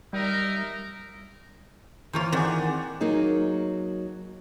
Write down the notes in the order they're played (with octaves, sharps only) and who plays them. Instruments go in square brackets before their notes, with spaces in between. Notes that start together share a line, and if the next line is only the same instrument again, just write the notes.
[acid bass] G3 [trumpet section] D#4 A#4 E5
[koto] E3 A#3 F4 [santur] C5 C#5
[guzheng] D#3 [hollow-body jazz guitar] C4 G#4 [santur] D5 F#5 D6
[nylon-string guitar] F#3 A#3 D#4 G#4